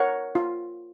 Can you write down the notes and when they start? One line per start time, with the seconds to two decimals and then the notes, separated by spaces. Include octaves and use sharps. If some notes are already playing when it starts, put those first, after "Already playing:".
Already playing: A#4 C#5 F#5
0.35 F4